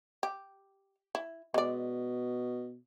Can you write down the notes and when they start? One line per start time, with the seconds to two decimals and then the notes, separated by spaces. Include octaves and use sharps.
0.23 G4
1.15 E4
1.54 B2 G#3 D5